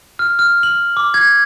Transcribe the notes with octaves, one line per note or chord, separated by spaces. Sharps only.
F6
F6
F#7
D6
G#6